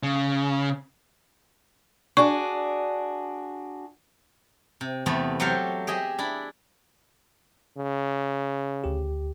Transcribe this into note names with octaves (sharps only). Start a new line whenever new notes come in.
C#3
D4 F#4 G#4 C#6
C3
E2 C3 A3 B3 B4 A5
F#3 F#4 G4 A4 C5 F5
G4 G#4 D#5 E5
D4 E4 B5
C#3
D2 G4